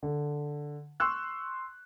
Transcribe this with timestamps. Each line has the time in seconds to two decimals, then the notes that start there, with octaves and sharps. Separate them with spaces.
0.03 D3
1.00 C6 C#6 E6 F#6